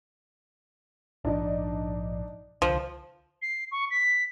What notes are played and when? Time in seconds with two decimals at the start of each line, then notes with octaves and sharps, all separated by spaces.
1.25 A#1 G#2 F3 D4 D#4 D5
2.62 C2 D3 F3
3.42 C7
3.71 C#6
3.90 B6